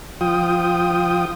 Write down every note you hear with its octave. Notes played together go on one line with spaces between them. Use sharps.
F3 F4 G5 D#6